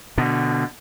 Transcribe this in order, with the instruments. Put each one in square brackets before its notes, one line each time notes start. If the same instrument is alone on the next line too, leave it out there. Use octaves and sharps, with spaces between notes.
[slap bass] B2 D3